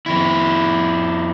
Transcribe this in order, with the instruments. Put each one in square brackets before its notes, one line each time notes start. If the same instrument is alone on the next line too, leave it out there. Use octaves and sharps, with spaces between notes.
[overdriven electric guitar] F2 E4